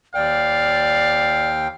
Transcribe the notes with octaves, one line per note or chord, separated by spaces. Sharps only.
D#2 D5 F5 G5